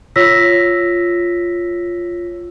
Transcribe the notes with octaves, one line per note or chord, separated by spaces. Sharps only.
F4 C#5 E6 A#6 B6